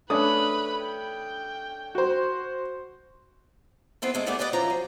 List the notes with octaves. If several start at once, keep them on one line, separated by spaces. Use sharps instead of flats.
A3 C#4 D4 B4 B5 D#6
G5
F#4 C5
B3 C4 E4 A4
E2 G#3 A3
G3 A3 B3 G4 G#4 D5
G4 A4 B4 D5 D#5
D2 E3 F3 C#4 A#5
F#3